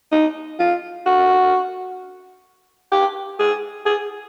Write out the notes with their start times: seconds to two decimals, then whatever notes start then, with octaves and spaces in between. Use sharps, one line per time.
0.12 D#4
0.59 F4
1.06 F#4
2.92 G4
3.39 G#4
3.86 G#4